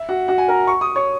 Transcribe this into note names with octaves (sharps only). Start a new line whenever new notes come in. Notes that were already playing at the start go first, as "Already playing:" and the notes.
Already playing: E5
F#4 F#5
F#4 F#5
G#5
A#4 A#5
C#6
D#6
C#5 C#6